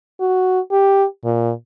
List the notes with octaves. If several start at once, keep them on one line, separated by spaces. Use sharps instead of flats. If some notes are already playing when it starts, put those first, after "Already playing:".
F#4
G4
A#2